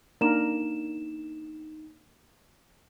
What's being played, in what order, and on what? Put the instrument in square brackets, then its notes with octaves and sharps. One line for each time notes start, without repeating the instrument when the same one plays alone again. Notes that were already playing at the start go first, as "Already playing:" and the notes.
[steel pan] A#3 D4 A#4 [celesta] D#4 E7